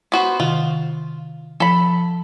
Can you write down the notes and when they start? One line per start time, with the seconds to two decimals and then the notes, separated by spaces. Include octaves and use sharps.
0.12 B3 F#4 C5
0.40 C3 D#3 F4
1.60 F3 A4 B5